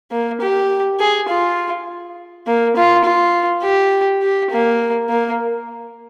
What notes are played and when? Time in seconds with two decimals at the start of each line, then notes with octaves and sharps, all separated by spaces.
0.11 A#3
0.41 G4
1.00 G#4
1.29 F4
2.47 A#3
2.76 F4
3.04 F4
3.63 G4
4.22 G4
4.51 A#3
5.09 A#3